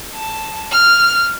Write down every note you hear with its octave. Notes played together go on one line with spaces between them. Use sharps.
A5
F6